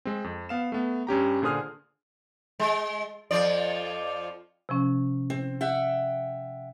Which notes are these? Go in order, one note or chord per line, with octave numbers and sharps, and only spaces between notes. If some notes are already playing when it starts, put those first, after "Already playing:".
G#3 C4
F2
B3 F5 E7
A3 B3
G2 C#4 G4 A#5
A#2 D3 G#4 C5 D#6 F6
G#3
F2 F3 D5
C3 F3 C#4
C4
E5 F#5 G5